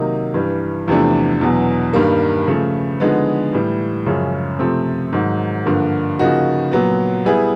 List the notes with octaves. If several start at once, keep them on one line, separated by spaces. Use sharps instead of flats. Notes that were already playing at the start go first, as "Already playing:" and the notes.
Already playing: C3 D#3 F#3 A#3 D#4
G2 E3 G3
E2 C3 F3 A3 D4
E2 B2 F#3
G2 D#3 G3 A#3
C#3 F3 A3
D3 F3 G#3 B3 D#4
A2 E3 G3
F#2 C#3 F3 G#3 C#4
C3 F3 A3 C4
G#2 D#3 F#3
G2 D3 F3 A#3
C#3 F3 A#3 D#4 F#4
A#2 F#3 B3
G3 B3 E4 G#4